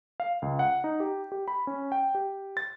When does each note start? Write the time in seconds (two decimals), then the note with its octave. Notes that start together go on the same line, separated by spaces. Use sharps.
0.20 F5
0.42 C#2
0.59 F#5
0.84 D#4
1.00 G4
1.32 G4
1.48 B5
1.67 C#4
1.92 G5
2.15 G4
2.57 A6